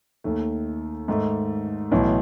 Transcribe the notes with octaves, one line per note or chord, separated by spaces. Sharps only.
D#2 D#3 A3
G#2 D#3 A3
B1 A2 E3